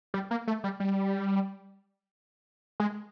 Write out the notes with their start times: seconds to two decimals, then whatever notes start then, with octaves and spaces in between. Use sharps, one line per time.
0.14 G3
0.31 A#3
0.47 A3
0.64 G3
0.80 G3
2.80 G#3